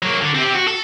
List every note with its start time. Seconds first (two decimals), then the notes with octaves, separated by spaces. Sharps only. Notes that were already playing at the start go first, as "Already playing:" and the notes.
0.03 F#3 A#3
0.21 D3
0.35 C4 G4
0.55 F#4
0.68 A4